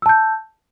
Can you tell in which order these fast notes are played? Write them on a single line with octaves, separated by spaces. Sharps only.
E6 A5 G6